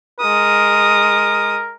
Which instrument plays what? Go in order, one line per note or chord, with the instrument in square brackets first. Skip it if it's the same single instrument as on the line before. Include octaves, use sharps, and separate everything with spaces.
[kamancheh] G#3 D#6 [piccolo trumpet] A#4